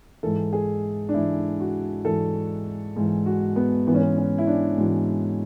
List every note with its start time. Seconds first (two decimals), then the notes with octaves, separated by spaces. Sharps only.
0.23 G#2 E3 A4
0.53 G#4
1.09 D4
1.14 G#2 E3 E4
1.60 F#4
2.05 G#2 E3 A4
2.96 G#2 E3
3.26 F#4
3.56 B3
3.87 E3 B3
3.91 G#2 C#4
4.01 B3
4.18 C#4
4.38 E4
4.47 D4
4.78 G#2 E3 F#4